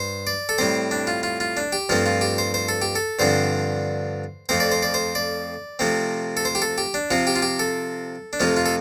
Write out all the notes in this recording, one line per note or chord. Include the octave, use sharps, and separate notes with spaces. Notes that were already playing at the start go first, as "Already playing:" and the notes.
Already playing: G2 C5
D5
A4
A2 G3 C4 C5
D4
F4
F4
F4
D4
G4
G2 F3 A3 C4 F4
F4
G4
C5
C5
A4
G4
A4
G2 D3 F3 C4 C5
F2 F3 A3 C4 C5
D5
C5
D5
C5
D5
C3 F3 A3 C4
A4
C5
G4
A4
G4
D4
C3 F3 C4 F4
G4
F4
G4
A4
D4
F2 C3 F3 A3 F4
F4
A4